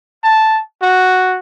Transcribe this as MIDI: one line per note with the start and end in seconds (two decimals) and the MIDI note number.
0.24 0.60 81
0.82 1.39 66